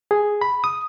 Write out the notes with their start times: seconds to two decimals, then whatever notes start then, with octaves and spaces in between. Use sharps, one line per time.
0.11 G#4
0.41 B5
0.64 D#6